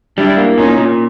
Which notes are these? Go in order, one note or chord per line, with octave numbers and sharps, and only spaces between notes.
G3 D4 E4
A#3
A#2 C#4 D#4
A#2